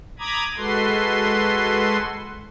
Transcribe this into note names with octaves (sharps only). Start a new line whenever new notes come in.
A#5 B5 D6 D#6 G#6
G#3 F#4 A4 B4 C6